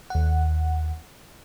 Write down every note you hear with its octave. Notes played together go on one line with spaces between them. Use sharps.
D#2 F#5